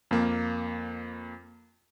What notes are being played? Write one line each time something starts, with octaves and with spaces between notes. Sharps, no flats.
F2 A#3